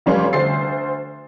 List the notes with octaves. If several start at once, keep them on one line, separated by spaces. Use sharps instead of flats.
F1 G3 C#4 D5 F5 C6
D2 C5 A6 C7